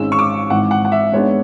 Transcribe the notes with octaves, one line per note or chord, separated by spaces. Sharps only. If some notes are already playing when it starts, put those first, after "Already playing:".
Already playing: G#1 G#2 G#3 C#4 E6
C#6
D6
G#1 G#2 E3 F#5
F#5
F#5
E5
G#2 G#3 B3 D4 C#5